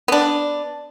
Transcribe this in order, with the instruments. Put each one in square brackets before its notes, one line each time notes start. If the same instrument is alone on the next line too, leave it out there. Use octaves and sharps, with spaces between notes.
[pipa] B3 D4